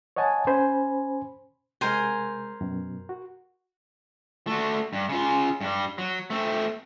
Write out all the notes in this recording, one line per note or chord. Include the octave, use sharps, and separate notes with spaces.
C#5 D#5 F#5 G#5 A5
C#4 C5 G#5 B5
C3 G#3 A#4 C5 G#5
F#2 B2
F#4
A3 F#4
G2
C#3 F4
G2 G3
F#3
A3 C4